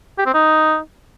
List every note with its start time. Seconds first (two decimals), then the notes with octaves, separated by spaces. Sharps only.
0.18 G4
0.26 C4
0.34 D#4